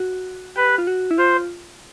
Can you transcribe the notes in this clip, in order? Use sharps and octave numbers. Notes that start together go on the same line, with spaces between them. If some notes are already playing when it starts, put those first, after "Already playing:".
Already playing: F#4
G4 B4
F4
F#4
E4
F4 C5